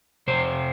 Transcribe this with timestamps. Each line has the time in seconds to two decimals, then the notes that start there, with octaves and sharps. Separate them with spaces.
0.27 F2 C3 C5